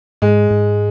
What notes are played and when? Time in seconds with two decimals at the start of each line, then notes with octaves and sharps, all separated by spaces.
0.22 G#2 G#3
0.51 G#2